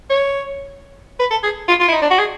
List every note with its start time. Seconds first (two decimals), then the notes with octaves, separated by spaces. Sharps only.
0.10 C#5
1.19 B4
1.30 A4
1.43 G#4
1.68 F4
1.80 F4
1.88 E4
1.92 D#4
2.02 D4
2.10 F#4
2.19 G#4